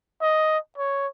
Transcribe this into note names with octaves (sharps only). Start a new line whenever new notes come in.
D#5
C#5